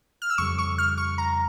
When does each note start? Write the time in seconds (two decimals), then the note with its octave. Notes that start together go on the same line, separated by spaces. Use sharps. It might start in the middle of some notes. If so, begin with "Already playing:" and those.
0.22 F6
0.30 E6
0.38 F2 C#3 G3 C#6
0.59 C#6
0.78 F6
0.98 C#6
1.18 A#5